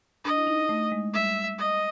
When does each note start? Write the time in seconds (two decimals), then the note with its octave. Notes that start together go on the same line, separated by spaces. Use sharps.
0.25 D4 D#5
0.37 E4
0.47 D#4
0.69 A3
0.92 G#3
1.14 G3 E5
1.58 D#5